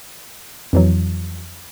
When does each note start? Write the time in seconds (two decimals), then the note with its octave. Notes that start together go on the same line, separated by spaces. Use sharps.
0.73 F2 E3 F#3